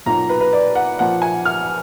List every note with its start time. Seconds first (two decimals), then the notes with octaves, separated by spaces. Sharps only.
0.06 B1 A#2 F#3 A#3 F4 A#5
0.29 B4
0.41 B4
0.53 D5
0.75 F#5
0.99 A#2 F3 A#3 F#5
1.22 G#5
1.45 F6